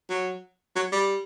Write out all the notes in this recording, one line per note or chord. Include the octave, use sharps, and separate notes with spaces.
F#3
F#3
G3